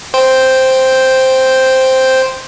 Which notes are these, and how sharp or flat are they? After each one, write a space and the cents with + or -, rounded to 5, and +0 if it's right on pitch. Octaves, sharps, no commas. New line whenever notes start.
C5 +0 G5 +0